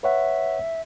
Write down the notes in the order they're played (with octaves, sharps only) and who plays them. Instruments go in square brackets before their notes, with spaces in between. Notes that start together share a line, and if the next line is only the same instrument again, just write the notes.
[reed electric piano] B4 C#5 F#5 [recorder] E5